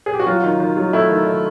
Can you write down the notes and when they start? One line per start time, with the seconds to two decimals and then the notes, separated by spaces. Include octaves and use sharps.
0.06 G#4
0.14 G4
0.20 F#4
0.27 F#3 F4
0.44 D#3
0.60 D#3
0.77 F#3
0.93 A3 E4
1.10 D#3
1.27 D#3